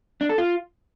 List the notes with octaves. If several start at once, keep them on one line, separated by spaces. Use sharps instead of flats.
D4
A4
F4